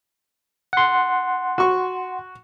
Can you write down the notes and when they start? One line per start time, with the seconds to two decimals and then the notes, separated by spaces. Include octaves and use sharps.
0.73 F#5 C6
1.58 F#4 C#6